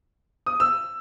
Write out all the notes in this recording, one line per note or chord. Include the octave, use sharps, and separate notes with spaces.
D#6
E6